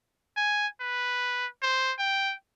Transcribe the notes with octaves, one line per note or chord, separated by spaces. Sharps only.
G#5
B4
C5
G5